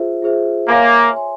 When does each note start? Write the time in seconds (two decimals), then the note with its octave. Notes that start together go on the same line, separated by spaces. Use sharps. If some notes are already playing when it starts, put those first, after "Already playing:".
Already playing: F4 G#4 C5 E5
0.22 F4 G#4 C5 E5
0.68 A#3 C#5 E5 G#5 C6
1.13 C#5 E5 G#5 C6